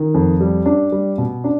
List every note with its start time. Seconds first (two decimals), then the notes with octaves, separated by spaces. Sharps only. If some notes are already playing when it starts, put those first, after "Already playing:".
Already playing: D#3
0.14 F2
0.41 G3
0.66 D4
0.92 G3
1.18 B2
1.44 D4